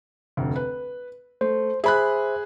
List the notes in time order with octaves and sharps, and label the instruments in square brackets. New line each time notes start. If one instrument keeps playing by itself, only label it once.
[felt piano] F1 D2
B4
[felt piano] A3 [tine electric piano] C5
[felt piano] G#4 B5 F#6 [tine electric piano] C5 E5